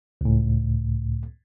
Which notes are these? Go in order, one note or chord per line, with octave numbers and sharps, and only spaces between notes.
C#2 A2